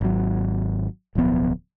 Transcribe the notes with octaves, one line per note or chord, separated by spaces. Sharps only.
G#1 F#3
D1 B1 F3 B3